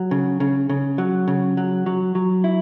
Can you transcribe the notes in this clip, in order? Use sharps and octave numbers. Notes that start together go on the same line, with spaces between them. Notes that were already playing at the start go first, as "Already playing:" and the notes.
Already playing: F#3
C#3
C#3
C#3
F#3
C#3
F#3
F#3
F#3
E4